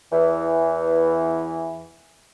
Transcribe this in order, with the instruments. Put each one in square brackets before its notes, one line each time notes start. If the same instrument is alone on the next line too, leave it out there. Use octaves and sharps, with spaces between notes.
[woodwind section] E2 E3